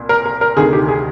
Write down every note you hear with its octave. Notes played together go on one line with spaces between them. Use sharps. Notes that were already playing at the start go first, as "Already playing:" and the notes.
Already playing: C2 A#2
A#4
A#4
A#4
D2 C3 D#3 G#4
G4
G#4